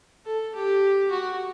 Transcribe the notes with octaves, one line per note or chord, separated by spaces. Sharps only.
A4
G4
F#4